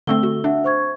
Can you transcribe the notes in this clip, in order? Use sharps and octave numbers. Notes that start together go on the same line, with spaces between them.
D3 A3 C4 A4 E6 G7
F#4
D4 E5 F#5
C5 C#6 G#6